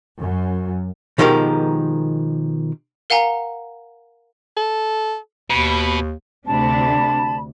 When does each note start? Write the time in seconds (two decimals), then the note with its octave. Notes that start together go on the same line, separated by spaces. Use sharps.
0.19 F#2
1.18 B2 D#3 F3 G#3 G4 A#4
3.10 A#4 F5 F#5 G#5 A#5
4.57 A4
5.50 D#2 B2 B5
6.47 D2 C3 D4 A5 B5